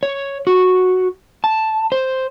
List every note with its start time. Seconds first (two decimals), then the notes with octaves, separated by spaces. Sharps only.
0.03 C#5
0.47 F#4
1.44 A5
1.92 C5